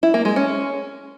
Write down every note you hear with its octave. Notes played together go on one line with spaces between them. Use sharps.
E4
A#3
G#3
C#4